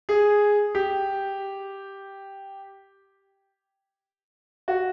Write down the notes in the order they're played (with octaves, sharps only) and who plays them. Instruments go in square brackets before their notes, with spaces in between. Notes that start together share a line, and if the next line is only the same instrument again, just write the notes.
[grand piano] G#4
G4
F#4